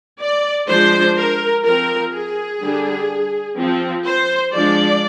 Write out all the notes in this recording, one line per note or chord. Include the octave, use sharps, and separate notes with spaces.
D5
F3 G#3 D4 C5
A#4
F3 C4 A#4
G#4
D3 G3 D4
F3 C4
C5
F3 G#3 D4 D5